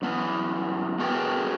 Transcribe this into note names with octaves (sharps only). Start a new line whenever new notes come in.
F#2 B3 E4
A3 F#4 G#4 A#4 B4 G5